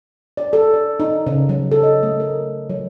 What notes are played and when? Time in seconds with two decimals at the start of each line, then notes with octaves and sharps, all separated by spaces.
0.37 D5
0.53 A4
0.74 D5
1.00 D#4
1.27 C#3
1.49 F#3
1.72 A4
1.83 D#5
2.03 A3
2.20 A#4
2.70 F#3